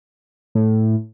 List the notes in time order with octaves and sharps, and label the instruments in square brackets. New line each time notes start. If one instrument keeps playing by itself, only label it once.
[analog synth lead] A2